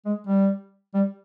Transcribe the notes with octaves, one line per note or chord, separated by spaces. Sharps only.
G#3
G3
G3